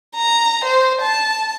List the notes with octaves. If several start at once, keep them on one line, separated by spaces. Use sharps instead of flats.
A#5
C5
A5